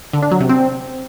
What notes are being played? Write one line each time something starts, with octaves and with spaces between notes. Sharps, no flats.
D3
D4
F#3
C3
C4